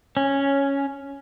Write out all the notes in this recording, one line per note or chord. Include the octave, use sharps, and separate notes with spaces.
C#4